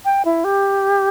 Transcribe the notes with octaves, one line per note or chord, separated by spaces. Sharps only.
G5
E4
G4